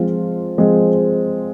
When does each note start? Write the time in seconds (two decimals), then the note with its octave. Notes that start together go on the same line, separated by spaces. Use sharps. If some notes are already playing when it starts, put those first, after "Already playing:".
Already playing: F3 G#3 C4 F4
0.58 F3 G#3 C4 F4